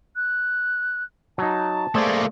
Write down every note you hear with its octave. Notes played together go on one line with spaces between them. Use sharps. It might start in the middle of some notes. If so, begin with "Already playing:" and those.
F#6
F#3 D#4 A5
A3 A#3 G#4 C5 D5